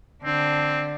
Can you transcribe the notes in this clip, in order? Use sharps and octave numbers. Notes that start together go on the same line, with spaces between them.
D3 C4 D4